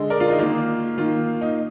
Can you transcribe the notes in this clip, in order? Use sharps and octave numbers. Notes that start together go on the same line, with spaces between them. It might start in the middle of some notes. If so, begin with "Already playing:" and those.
Already playing: D3 G#3 D#5
A#4 D5
F4
D#4
D#3 A#3 F4
D#3 A#3 F4
D#4